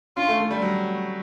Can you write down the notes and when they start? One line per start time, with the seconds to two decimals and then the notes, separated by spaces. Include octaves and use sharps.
0.17 C#4 F4
0.28 A3
0.39 A3
0.51 G3
0.62 F#3